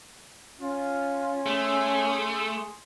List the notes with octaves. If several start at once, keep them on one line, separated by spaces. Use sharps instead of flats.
C#4 F4
A3 G#4 C6